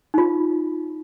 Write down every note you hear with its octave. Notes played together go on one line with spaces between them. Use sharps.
D#4 F4